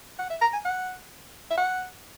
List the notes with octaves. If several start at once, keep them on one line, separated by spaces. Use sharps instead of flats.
F#5
E5
A#5
G#5
F#5
E5
F#5